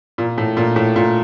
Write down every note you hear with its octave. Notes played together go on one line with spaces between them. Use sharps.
A#2
A2
A#2
A2
A#2